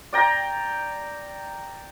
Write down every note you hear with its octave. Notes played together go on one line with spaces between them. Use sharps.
D5 G5 A#5